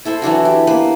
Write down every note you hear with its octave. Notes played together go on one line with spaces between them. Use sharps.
E4 A4 C5 E5
E3 F#3 D4 F#4
G4
A#3 B3 B4